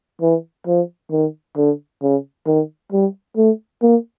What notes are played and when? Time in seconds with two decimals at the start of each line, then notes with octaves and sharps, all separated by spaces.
0.22 E3
0.67 F3
1.12 D#3
1.57 D3
2.02 C#3
2.47 D#3
2.92 G3
3.37 A3
3.82 A#3